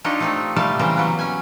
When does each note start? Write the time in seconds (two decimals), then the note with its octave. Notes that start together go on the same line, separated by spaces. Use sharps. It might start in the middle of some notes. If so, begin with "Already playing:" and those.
0.04 D4 D#4 F4 G4 C#5 D#5
0.20 A3 C4 D#4
0.56 C3 G3 A3 A#3 F5 A5
0.79 C#3 E3 G3 A#4 C5 G5
0.97 F#3 B3
1.19 C#4 G#5